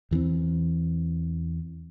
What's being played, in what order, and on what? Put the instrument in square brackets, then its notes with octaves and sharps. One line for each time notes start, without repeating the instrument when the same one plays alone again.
[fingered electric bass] E2 E3 A3 C4